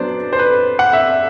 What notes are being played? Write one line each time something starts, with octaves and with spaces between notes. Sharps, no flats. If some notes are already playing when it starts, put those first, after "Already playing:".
Already playing: F#3 B3 D4 C5 D5
C5
B4
F#5
E5